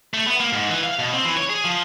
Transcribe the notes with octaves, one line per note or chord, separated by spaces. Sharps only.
A3
B3
A#3
G#2
E3
F5
B2
C4
E3
C#5
G#4
F3